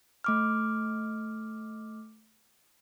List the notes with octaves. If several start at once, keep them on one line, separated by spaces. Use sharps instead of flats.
A3 D6 F6